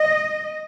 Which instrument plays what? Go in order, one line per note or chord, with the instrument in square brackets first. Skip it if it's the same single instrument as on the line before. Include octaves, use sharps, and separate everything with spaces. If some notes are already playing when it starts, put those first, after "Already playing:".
Already playing: [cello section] D#5